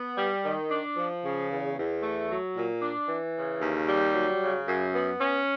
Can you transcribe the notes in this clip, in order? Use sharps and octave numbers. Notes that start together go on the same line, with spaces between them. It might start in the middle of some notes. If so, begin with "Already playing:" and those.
Already playing: B3
G3
D#3
D4
F3
C#3
E2
E2
A3
F#3
A#2
D4
E3
C#3
D#2
G3
F#3
C#3
F#2
B3
C#4